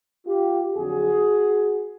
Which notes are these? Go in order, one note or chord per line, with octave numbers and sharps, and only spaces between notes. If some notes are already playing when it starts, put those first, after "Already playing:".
F4 G4
F2 D3 F#3 F#4 G#4